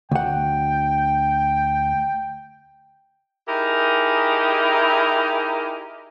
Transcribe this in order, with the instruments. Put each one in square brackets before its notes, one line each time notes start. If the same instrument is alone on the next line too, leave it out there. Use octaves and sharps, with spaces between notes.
[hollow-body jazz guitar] D2 F#5 [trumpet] G5
[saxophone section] D#4 E4 G4 G#4 A#4